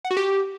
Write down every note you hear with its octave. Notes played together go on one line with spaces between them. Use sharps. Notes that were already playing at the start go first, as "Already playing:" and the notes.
F#5
F#4
G4